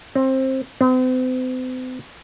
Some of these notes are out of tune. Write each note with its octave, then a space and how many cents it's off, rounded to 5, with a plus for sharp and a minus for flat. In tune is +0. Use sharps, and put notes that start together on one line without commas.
C4 +20
C4 -40